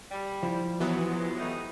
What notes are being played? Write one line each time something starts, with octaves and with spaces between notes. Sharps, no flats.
G3
F3 E4
C3 E3 F#3 G#3 B3
G3 A3 D#4